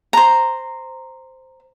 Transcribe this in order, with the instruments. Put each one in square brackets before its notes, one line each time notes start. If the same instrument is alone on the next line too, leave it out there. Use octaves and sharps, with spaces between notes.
[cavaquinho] C5 A#5